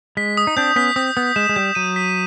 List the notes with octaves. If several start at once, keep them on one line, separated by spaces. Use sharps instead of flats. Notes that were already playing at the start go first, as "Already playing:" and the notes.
G#3 B6
D#6
D#4
C4 D4 G6
B3 C#4 B6
C4 D#6
B3 D#6
G#3 E7
G#3
G3 G6
F#3 D#7
B6